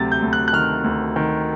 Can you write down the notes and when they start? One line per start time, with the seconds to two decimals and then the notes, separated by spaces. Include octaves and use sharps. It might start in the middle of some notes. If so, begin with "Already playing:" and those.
Already playing: D2 C3 F#3 A6
0.12 G6
0.22 D2
0.33 F#6
0.48 F#6
0.53 D#3 F6
0.84 D2
1.16 D#3